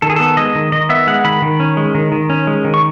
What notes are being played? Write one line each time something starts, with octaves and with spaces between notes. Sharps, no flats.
D#3 A4
G#4
B3 A4
G#3 D#5
D#3
D#3 D#5
B3 E5
G#3 F#5
D#3 B5
D#3
C#4
G#3
D#3
D#3
C#4
G#3
D#3
C#6